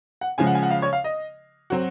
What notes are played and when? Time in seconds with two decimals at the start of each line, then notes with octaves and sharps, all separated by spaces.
0.21 F#5
0.38 C#3 F3 G#3 G#5
0.47 F#5
0.55 G#5
0.63 F#5
0.71 F5
0.82 C#5
0.93 F5
1.04 D#5
1.70 F#3 C4 F#4